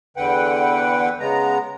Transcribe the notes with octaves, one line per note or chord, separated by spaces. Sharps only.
E2 D3 B4 F#5 G5
C#3 G#3 B3 A#5